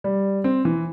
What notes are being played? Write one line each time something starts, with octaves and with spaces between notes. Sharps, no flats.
G3
C4
E3